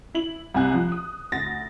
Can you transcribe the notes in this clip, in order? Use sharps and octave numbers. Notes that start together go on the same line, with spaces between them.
E4 F#7
C2 C3 G#5 F#6
F3
D#6
D2 A6 A#6